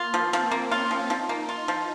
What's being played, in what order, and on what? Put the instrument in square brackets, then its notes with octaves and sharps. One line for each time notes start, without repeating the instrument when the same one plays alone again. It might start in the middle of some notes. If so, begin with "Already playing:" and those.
Already playing: [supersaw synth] A#3 [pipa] F4
[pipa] F3
[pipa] F3 [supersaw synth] C4
[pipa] A#3
[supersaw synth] C#4 [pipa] F4
[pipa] F3
[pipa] F3 [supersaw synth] D#4
[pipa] A#3
F4
F3